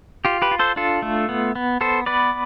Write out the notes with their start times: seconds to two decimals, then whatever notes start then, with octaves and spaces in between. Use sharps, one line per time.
0.25 F4 G4
0.42 G4 B4
0.51 F4
0.59 A4 C5
0.76 D4 F4 A4
1.02 A3
1.29 B3
1.55 B3
1.81 B3 A4 C5
2.06 B3 B4 D5